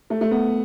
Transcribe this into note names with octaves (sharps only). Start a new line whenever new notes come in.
A3
A3
B3